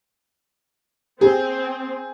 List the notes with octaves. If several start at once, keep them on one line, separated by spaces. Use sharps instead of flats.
C4 G#4